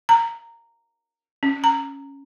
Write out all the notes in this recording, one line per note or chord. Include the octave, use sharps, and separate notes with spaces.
A#5
C#4
A#5